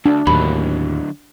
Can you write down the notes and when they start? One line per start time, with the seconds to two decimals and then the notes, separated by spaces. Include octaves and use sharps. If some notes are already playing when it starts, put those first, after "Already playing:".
0.06 D2 D4
0.27 D#2 A2 D3 F#3 B5